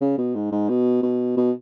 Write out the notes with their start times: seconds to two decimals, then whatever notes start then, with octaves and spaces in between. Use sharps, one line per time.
0.01 C#3
0.18 B2
0.35 G#2
0.52 G#2
0.69 B2
1.03 B2
1.37 B2